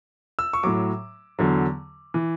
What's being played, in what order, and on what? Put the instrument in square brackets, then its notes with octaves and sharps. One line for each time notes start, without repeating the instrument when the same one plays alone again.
[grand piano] E6
C#6
A2 F#3 D6
E2 D3 F#3
E3